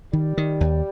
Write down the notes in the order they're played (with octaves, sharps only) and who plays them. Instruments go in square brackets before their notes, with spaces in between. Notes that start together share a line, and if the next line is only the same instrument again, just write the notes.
[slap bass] D#3 [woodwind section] G3
[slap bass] D#3
D#2